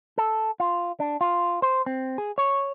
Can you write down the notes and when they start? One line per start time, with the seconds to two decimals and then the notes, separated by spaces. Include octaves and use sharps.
0.18 A4
0.60 F4
1.00 D4
1.21 F4
1.62 C5
1.86 C4
2.18 G#4
2.38 C#5